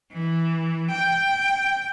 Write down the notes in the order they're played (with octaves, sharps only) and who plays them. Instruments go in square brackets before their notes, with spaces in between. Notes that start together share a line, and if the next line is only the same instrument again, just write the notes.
[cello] E3
G5